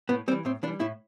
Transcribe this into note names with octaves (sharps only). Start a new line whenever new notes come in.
A2 B3
E3 G3 C4
A2 C4
E3 G3 D4
A2 E4